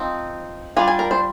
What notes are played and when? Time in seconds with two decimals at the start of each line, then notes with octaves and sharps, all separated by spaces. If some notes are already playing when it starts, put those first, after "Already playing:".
Already playing: F3 C4 D#4
0.77 G3 D4 F4 G#5
0.88 G#5
0.99 A#4
1.11 C5